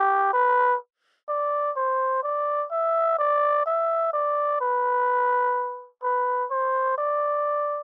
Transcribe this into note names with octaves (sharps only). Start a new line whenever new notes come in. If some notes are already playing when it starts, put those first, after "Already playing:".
Already playing: G4
B4
D5
C5
D5
E5
D5
E5
D5
B4
B4
C5
D5